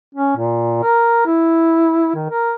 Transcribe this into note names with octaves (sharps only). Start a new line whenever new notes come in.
C#4
A#2
A#4
E4
D#3
A#4